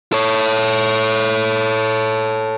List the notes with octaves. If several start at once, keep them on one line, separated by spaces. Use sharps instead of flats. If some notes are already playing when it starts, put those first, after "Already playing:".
A4 C#5